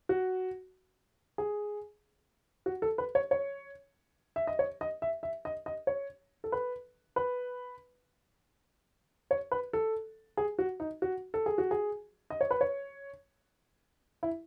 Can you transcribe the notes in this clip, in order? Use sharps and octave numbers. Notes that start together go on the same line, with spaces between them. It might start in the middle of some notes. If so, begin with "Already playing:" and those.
F#4
G#4
F#4
A4
B4
C#5
C#5
E5
D#5
C#5
D#5
E5
E5
D#5
D#5
C#5
A4
B4
B4
C#5
B4
A4
G#4
F#4
D#4
F#4
A4
G#4
F#4
G#4
D#5
C#5
B4
C#5
E4